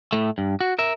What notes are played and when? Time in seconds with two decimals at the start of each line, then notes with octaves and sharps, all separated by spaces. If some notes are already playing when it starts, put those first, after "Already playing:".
0.13 A2 A3
0.38 G2
0.61 F#4
0.79 A#4 E5